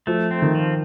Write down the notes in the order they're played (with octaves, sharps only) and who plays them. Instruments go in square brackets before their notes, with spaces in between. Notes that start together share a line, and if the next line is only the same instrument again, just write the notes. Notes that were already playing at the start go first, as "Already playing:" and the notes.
[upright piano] F3 [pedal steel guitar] A3
[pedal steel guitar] C4
[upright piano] D#3
[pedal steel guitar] F3